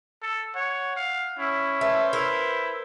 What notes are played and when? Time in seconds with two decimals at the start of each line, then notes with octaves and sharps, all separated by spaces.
0.22 A4
0.55 C#5 F#5
0.96 F5
1.38 C#4 E4
1.81 A3 B4 C5
2.13 E4 A#4